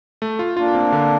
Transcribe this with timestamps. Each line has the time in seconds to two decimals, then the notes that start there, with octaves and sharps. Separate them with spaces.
0.22 A3
0.39 F4
0.57 A#3 D4 F4
0.75 C4
0.92 D3